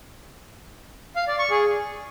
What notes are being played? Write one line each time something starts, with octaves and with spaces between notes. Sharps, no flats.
F5
D5
C#6
G#4